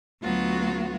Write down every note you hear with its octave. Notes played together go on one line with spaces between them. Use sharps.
D2 F#3 B3 F4 F#4